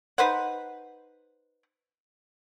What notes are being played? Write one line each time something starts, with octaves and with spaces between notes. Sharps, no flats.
D#4 B4 C5 F#5